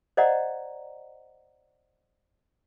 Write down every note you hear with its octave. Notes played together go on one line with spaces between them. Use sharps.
C5 D5 D#5 F#5 A#5